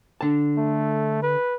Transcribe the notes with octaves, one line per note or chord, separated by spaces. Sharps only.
D3 A5
A3
B4